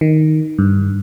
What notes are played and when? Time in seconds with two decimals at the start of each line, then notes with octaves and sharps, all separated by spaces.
0.01 D#3
0.59 G2